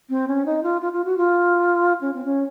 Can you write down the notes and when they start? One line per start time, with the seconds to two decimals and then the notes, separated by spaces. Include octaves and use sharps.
0.10 C4
0.28 C#4
0.46 D#4
0.63 F4
0.81 F4
0.93 F4
1.05 F#4
1.18 F4
2.01 C#4
2.14 C4
2.25 C#4